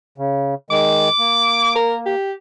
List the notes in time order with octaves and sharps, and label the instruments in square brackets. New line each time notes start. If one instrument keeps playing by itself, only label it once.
[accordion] C#3
[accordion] D#3 G#3 [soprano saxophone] D6
[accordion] A#3
[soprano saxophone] A#4
G4